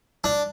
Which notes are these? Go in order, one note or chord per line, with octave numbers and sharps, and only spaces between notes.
D4